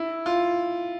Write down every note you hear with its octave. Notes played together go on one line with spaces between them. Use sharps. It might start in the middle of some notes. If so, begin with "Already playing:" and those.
Already playing: E4
F4